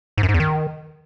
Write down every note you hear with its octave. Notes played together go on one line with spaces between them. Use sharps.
G#2
F#2
G#2
E2
D#3